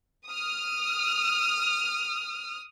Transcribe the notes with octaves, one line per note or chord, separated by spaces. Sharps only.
D#6 F6